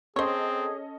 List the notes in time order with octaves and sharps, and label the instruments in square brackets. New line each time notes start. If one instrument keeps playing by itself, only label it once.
[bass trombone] C4 [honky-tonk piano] C#4 A4 D#5 [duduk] G#4 [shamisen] C5 C#5